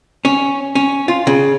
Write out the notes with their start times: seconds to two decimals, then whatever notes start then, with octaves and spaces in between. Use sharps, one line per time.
0.25 C#4
0.75 C#4
1.08 F4
1.27 C#3